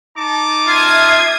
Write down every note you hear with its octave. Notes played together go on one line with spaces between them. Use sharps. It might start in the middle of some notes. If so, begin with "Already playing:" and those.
D#4 A5 D6
F4 E5 D#6 G#6